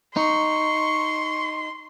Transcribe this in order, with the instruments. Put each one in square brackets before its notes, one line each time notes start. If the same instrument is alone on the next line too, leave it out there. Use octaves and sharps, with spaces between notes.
[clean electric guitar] D#4 [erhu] C6 [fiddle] C#6